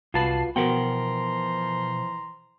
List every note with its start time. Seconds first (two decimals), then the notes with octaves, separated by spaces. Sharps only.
0.14 C2 F4 F#4 B4 A5 C7
0.56 B2 E3 F3 A#4 F#5 G5 A#5 C6